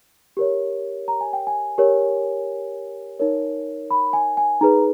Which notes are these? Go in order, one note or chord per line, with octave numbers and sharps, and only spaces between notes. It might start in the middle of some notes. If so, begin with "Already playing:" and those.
G4 A#4 C#5
A#5
G#5
G5
G#5
G4 A#4 C#5
D#4 A#4 C#5
B5
G#5
G#5
D#4 G#4 B4 A#5